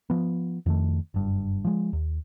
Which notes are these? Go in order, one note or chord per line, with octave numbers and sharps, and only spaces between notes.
F3 B3
F2 D#3 A3
F#1 G2
F3 G#3
D#2